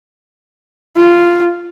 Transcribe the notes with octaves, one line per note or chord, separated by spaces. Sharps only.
F4